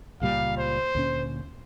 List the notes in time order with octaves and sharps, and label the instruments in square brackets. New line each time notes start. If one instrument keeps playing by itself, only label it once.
[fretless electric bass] C#2 A#2 G3 [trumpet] F5
[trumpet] C5
[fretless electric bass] D2 A#2 C#4